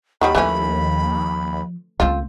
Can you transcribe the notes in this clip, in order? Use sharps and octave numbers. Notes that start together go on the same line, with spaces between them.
D#2 D#3 F#3 G3 B5
E3 F3 A3 C#4
C#2 A3 C4 F4